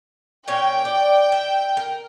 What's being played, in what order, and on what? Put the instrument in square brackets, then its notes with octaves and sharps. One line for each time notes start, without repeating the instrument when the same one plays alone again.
[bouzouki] A#2 C#4 C#5 [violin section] G5
[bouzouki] D5
E5
A#4